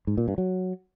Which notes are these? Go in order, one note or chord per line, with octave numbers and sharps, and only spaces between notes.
G#2
A#2
G2
F#3